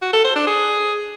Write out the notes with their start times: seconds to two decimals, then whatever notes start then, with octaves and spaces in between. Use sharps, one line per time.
0.02 F#4
0.13 A4
0.24 C5
0.36 D4
0.47 G#4